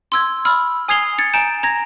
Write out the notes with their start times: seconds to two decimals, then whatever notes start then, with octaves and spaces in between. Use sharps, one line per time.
0.12 C6 E6 G#6
0.45 B5 E6 F6
0.88 G#5 D#6 G#6 C7 F7 G7
1.18 G#6 A6 C#7
1.34 G#5 A#5 G6 D7 E7
1.63 A#5 G#6 A#6